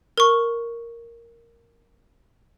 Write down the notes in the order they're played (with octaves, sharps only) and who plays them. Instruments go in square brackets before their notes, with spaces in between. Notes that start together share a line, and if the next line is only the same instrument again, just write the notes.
[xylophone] A#4 C#6